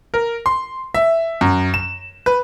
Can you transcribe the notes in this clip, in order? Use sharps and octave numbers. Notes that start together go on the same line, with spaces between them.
A#4
C6
E5
F#2
E7
B4